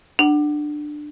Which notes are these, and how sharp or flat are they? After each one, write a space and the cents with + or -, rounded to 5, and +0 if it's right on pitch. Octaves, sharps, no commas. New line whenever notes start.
D4 +20 F#5 +20